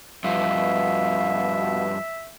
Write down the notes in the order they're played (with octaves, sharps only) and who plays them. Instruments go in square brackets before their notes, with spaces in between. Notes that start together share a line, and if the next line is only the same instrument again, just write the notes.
[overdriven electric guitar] G2 F3 [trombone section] B2 [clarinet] E5 [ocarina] F5